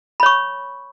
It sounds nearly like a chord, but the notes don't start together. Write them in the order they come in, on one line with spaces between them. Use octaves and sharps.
B5 C#5 C#6